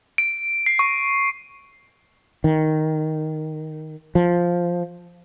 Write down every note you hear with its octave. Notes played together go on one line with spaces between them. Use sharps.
D7
C7
C#6
D#3
F3